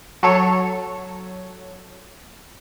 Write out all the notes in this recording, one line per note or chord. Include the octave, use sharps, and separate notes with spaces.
F#3 A4 C#5